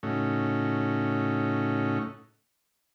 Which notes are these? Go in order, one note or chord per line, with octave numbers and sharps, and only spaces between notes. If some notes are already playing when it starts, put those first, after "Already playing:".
A2 C#3 A3 C#4 D#4 F#4